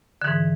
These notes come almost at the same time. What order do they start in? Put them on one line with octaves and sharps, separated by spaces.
D3 E3 G#2